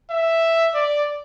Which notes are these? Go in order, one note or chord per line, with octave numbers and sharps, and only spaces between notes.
E5
D5